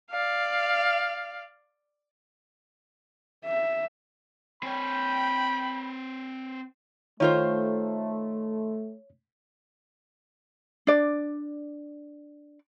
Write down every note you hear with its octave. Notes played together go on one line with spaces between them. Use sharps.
D5 F5
E5
C4 C#5 G5 B5
D#3 A3 F4 C5 C#5
D4 D5